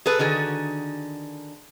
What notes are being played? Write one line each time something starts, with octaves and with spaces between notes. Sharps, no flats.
G#4 A4 B4
D3 D#3 F#4 G#4